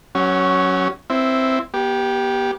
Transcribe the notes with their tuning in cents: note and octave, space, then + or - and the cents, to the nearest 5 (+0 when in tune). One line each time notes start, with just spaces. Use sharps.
F#3 +0 C#4 +0 F#4 +30
C4 +0 E4 +0
B3 -40 G4 +0